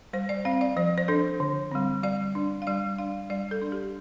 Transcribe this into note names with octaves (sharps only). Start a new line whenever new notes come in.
G3 C5
D5
C4 F5
D5
F3 C5
C5
D4 A4
D3
G3 C4
G3 D5
D4
F5
G3 D5
D4 F5
G3 D5
A4
D4
G4